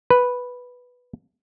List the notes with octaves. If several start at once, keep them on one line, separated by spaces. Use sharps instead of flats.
B4